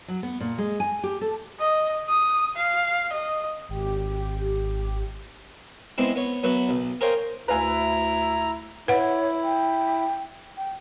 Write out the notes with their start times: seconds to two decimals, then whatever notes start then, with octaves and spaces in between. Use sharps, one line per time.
0.08 F#3
0.23 B3
0.40 A#2
0.58 G#3
0.80 G#5
1.03 G4
1.21 A4
1.60 D#5
2.09 D#6
2.56 F5
3.13 D#5
3.69 G#1 G4
5.98 G#3 B3 C4 E4
6.16 B3 C#5
6.43 F#3 B3 F#4 B4 E5
6.69 B1
7.01 G#4 A#4 C5 C#5 F5 G5
7.48 D2 E4 B4 F5 G#5 A#5
8.88 E4 B4 C#5 F#5
9.43 G5
10.57 G5